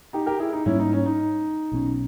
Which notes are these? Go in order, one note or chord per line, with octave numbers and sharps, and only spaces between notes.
D#4 G4
G4 A#4
E4 G#4
D#4
G#2 G3 A#3 C#4 E4
D#4
C#4
D#4
B1 B2 G3 C#4